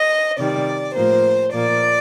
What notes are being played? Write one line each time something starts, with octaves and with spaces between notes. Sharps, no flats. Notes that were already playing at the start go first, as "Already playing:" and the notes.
Already playing: D#5
C3 D#3 G3 D5
A2 F3 A#3 C5
A#2 F3 A#3 D5